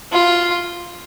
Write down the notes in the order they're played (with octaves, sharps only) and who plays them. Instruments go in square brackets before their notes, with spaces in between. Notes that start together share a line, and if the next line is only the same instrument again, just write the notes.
[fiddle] F4